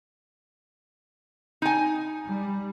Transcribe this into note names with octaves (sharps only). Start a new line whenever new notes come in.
D#4 G#5
G3